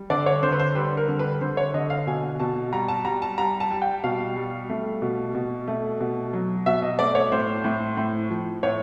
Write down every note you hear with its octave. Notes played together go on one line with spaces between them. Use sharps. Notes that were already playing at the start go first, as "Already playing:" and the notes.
Already playing: G3
D3 D5
C#5
D3 C5
B4
C5
G3 B4
A#4
D3
B4
D3 C5
C#5
D3 D#5
F5
B2 G#5
B2 A5
G3 A#5
A5
G3 A#5
A5
G3 A#5
A5
G3
G5
B2 F5
G3
A3
B2
B2
A3
B2
F#3
B2 E5
D#5
A3 D5
C#5
A2 C5
A2
A2
F3
A2 C#5